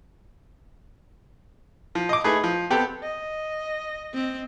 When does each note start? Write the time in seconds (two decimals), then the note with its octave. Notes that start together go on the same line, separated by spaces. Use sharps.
1.95 F3
2.09 D#5 D6
2.24 A3 D#4 G#4 B4
2.44 F3
2.70 B3 C4 G4 A4
3.03 D#5
4.14 C4